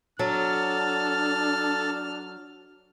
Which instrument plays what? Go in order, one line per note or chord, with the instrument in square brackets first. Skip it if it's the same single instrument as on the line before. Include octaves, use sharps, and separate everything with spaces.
[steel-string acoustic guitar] F#3 [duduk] D4 [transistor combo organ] A4 [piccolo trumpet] F6